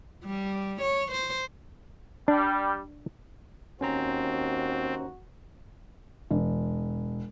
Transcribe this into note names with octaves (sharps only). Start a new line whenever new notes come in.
G3
C#5
C5
G3 D4
D#2 C4 C#4 F#4 C5 A#5
E1